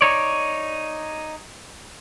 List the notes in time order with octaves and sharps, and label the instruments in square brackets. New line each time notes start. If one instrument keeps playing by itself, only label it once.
[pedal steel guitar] D#4 C#5 D5